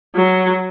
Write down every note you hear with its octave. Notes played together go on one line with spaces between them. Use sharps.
F#3